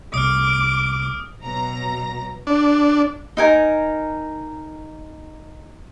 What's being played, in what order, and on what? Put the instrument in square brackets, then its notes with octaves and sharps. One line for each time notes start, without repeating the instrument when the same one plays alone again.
[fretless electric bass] C2 [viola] D6 [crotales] D#6 F6
[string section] B2 F#3 A#5 A#6
[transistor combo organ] D4
[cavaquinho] D#4 A#4 G#5